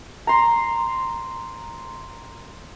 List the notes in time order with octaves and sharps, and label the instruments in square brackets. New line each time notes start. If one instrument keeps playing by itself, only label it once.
[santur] A#5 C6